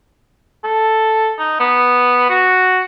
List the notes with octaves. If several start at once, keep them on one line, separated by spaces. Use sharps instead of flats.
A4
D#4
B3
F#4